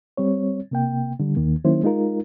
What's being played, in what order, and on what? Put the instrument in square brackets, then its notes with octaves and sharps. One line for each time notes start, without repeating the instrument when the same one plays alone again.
[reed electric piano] G3 C4 C#5
C3 A#3 G5
D3 G3
D#2 D#3 A#3
D#3 F#3 A#3 C#4 E4 C5
G#3 D#4 F4 A#4